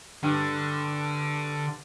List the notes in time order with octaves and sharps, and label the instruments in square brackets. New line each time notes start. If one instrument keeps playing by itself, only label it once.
[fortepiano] G2 [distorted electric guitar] D3